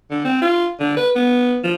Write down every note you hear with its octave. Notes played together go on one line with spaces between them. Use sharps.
D3
C4
F4
D3
B4
B3
F3